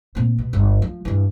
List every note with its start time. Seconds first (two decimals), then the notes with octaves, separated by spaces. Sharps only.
0.15 A#2 C4
0.38 B2
0.53 G1
0.82 F3
1.05 G2 E3